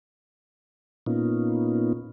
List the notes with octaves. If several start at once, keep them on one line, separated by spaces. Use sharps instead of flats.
A#2 A#3 B3 C#4 D#4 F4